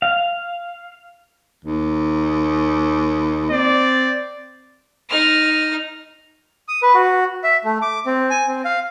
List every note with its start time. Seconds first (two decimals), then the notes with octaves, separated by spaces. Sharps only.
0.02 F5
1.65 D#2
3.51 C4 D5
5.10 D#4 F6
6.68 D#6
6.83 B4
6.95 F#4
7.44 E5
7.64 A3
7.82 D6
8.06 C4
8.30 G#5
8.48 C4
8.65 F5